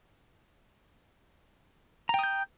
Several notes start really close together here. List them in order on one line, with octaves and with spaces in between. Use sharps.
A#5 G5 D#6 G6